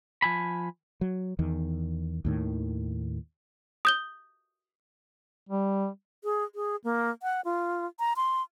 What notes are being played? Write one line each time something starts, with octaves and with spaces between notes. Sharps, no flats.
F3 G#5 B5
F#3
E2 D#3
D#2 A2 D#3
D#6 G6 G7
G3
G#4
G#4
A#3
F#5
F4
A#5
C6